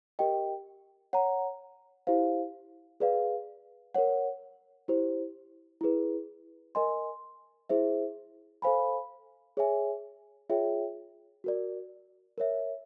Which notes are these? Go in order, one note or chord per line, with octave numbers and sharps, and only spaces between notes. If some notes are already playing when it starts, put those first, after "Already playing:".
G4 A#4 D#5 G5
C#5 F#5 A#5
E4 G4 C5 F5
G#4 B4 D5 F5
A#4 C#5 F#5
E4 G4 C5
E4 G#4 B4
A#4 D#5 G#5 C6
E4 G#4 C5 E5
A4 C5 F5 G#5 B5
G#4 C#5 E5 G#5
F4 G#4 C#5 E5 G5
F#4 A#4 D5
A#4 C#5 E5